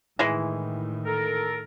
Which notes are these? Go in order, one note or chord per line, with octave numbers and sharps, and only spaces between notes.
A2 D#3 E3 G#3
A4 A#4